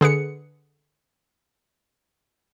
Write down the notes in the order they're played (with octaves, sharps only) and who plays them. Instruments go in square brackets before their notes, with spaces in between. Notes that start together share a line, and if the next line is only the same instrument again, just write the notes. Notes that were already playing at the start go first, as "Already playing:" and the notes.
[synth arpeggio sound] D3 G#4 B4 C#7